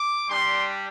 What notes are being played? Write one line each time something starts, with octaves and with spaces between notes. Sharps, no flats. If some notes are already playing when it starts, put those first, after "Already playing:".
Already playing: D6
G3 D4 G4 C6